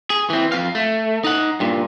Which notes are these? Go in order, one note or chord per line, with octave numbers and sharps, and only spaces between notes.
G#4
E3 C4
F2 F5
A3
D#4 F#5
G2 A#2